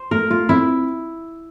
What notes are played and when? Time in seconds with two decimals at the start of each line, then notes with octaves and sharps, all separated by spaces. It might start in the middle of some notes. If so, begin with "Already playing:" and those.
Already playing: C5
0.11 A3 A#4
0.30 A3 F4
0.49 C4 E4